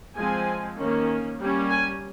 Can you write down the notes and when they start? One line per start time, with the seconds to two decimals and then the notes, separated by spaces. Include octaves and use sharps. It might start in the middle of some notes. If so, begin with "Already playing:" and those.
0.16 F3 G#3 C4 G#5
0.78 D#3 A#3 C#4
1.39 G3 A#3 C#4
1.70 G#5